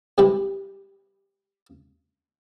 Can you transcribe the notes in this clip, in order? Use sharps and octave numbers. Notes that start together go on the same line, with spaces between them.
C3 G3 G#3 E4 G4 B4